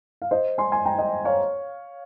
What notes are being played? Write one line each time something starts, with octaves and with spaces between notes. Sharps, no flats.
F5
C5 D#5
G#5 C6
G#5 C6
G5 A#5
D#5 G5
C#5 F5